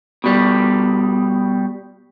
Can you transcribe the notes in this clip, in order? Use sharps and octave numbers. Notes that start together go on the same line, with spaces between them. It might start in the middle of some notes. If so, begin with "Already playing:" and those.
B2 G3